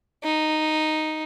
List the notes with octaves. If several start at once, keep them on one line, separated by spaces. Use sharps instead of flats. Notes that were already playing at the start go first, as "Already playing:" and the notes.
D#4